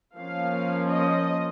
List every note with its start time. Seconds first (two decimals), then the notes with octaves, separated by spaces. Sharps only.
0.17 F3 A#3 C#4 F5
0.91 D#5